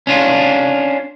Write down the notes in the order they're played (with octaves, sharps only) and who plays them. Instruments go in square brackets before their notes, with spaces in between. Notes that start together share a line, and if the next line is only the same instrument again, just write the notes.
[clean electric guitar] C#4 D4 F4